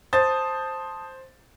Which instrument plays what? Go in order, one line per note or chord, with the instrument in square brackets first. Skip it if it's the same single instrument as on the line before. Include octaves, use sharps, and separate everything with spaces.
[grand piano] C5 A6 [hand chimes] A5 D#6